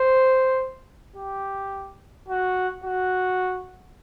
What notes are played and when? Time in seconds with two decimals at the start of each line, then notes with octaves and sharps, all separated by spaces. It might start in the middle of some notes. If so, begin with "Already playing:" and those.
Already playing: C5
1.16 G4
2.28 F#4
2.84 F#4